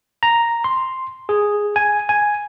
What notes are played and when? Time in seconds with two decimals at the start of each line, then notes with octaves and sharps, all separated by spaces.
0.23 A#5
0.64 C6
1.29 G#4
1.76 G#5
2.09 G#5